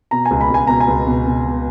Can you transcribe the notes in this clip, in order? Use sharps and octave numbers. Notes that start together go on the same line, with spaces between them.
B2 A#5
G#5
C#2
B5
C#2 G#5
B2 A#5
G#5
C#2
B2
B2
B2